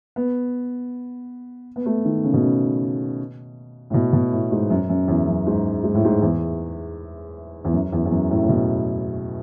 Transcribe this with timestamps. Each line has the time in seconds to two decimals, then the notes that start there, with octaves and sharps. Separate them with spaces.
0.16 B3
1.76 B3
1.86 A3
2.05 D#3
2.24 C#3
2.34 B2
2.43 C#3
3.90 A2
3.94 B2
4.13 B2
4.32 A2
4.51 G#2
4.70 F#2
4.89 F#2
5.08 E2
5.27 F#2
5.47 G#2
5.84 G#2
5.94 A2
6.05 G#2
6.22 E2
7.65 E2
7.73 F#2
7.92 E2
8.06 E2
8.11 F#2
8.30 A2
8.42 A2
8.49 B2